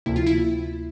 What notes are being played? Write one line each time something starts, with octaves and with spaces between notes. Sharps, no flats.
D2 C3 F3 A#3 E4
F4
E4